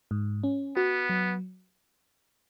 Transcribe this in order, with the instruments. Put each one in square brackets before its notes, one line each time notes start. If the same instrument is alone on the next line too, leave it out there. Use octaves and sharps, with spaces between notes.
[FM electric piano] G#2
C#4
[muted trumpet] B3 [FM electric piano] F#4
[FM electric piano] F#3